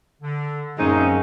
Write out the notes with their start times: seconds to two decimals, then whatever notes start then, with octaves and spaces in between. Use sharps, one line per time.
0.22 D3
0.78 F#2 G#3 A#3 C4 C#4 D#4